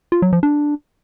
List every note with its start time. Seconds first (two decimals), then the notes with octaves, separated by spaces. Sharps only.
0.12 F4
0.22 F#3
0.33 F3
0.43 D4